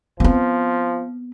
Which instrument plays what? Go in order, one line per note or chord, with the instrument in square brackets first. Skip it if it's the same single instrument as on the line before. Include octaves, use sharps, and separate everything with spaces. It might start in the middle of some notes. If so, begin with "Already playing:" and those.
[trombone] F3 [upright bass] B3 C4